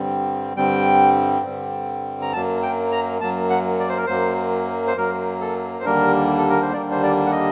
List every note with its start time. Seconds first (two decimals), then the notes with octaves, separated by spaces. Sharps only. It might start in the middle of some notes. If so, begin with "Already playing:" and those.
Already playing: G2 D3 G3 C4
0.56 G2 D3 G3 C4 G5
1.45 G2 D3 G3 C4
2.22 A#5
2.33 F#2 F#3 A#3 A5
2.63 G5
2.92 A#5
3.21 F#2 F#3 A#3 A5
3.50 F#5
3.80 D5
3.89 C5
3.97 A#4
4.06 F#2 F#3 A#3 C5
4.87 C5
4.97 F#2 F#3 A#3 A#4
5.41 A4
5.79 C5
5.85 D#2 D3 G3 A#3 D4 A#4
6.38 A4
6.50 A#4
6.62 C5
6.73 D#2 D3 G3 A#3 D4 D5
6.91 C5
7.03 D5
7.27 F#5
7.32 D#5